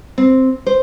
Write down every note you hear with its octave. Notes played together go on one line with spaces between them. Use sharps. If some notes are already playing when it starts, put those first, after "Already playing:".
C4
C5